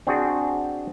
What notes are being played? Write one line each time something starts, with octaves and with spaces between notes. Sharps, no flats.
C4 D4 F#4 G#4